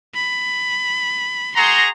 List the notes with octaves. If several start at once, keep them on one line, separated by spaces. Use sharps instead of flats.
B5
F#4 G#4 A#5 C6 G6